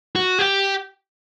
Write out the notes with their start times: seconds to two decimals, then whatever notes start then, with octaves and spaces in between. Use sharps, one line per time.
0.16 F#4
0.39 G4